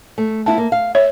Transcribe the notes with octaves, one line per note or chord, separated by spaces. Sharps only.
A3
B3 E4 F4 A5
A#3
F5
C#5 E5